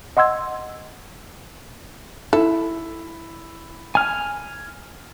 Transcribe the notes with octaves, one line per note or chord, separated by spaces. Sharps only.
D#5 F#5 C6 E6 G#6
E4 A4
G#5 F6